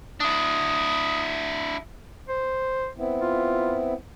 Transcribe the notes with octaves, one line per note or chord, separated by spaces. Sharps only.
D4 E4 D#6
C5
B3 C4 E4
F4